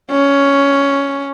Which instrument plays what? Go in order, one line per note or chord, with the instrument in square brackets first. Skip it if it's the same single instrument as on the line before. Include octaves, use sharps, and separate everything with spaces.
[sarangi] C#4